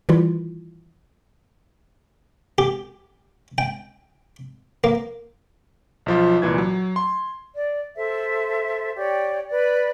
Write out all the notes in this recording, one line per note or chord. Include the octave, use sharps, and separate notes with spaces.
D#3 E3 G3 E4 F4
G4
G5
A#3
B1 F3 F4
C2 A#2 E3 G#6
F#3
C6
D5
A4 C5 E5
G4 C#5 D5 G5
B4 D5